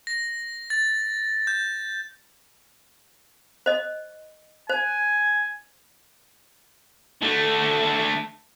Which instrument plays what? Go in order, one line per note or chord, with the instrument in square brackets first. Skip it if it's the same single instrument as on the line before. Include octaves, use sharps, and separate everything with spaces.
[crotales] A#6
A6
G6
[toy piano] C5 D#5
[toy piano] C5 [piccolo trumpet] G#5
[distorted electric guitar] D3 A3